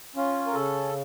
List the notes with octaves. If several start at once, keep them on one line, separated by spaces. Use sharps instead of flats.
C#4 F4
A#4
C#3 A4